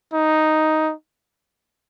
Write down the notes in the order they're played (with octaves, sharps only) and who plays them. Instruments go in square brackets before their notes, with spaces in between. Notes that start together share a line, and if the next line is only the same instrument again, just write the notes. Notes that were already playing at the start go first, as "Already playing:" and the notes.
[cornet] D#4